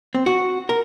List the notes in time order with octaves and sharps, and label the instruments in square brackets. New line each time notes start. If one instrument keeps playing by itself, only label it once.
[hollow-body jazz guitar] C4
F#4
A#4